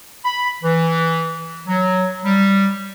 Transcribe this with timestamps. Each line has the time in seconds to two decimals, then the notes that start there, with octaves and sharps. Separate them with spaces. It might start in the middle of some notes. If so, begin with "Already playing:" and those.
0.25 B5
0.64 E3
1.68 F#3
2.25 G3